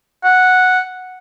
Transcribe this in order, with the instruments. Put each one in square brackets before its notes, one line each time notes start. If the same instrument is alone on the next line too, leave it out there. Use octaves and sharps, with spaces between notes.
[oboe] F#5